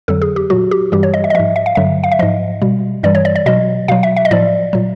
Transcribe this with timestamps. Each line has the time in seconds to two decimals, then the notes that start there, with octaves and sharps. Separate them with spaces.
0.08 F2 D3 F#3 A4
0.22 G#4
0.36 G4
0.50 A#2 F#3 F#4
0.71 G4
0.92 G2 E3 G3 G4
1.03 C#5
1.14 D#5
1.24 E5
1.30 D#5
1.35 G#2 F3 E5
1.56 E5
1.66 F5
1.75 G2 D3 F#3 E5
2.04 F5
2.12 E5
2.19 G#2 F3 D#5
2.62 B2 G3
3.03 G2 E3 G3 D5
3.15 C#5
3.25 D5
3.36 D5
3.46 B2 F#3 D#5
3.88 B2 F#3 F5
4.03 E5
4.16 E5
4.25 D#5
4.31 A2 F3 D5
4.73 A#2 F#3